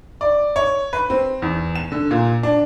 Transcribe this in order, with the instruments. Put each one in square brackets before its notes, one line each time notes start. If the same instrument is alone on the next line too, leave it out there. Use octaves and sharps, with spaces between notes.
[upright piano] D5
C#5
B4
C4
E2
E7
D3
A#2
D4